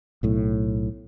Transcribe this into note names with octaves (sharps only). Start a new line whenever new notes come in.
B1 A2